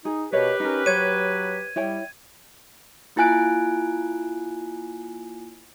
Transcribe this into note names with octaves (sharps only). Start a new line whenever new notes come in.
D#4 G#4
B2 G4 A#4 B4 C#5 D#5
C#4 D#4 A#4
F#3 C5 C#5 G#6 D#7
G3 E4 C#5 G5
A#3 E4 F4 G#5 F#6 D7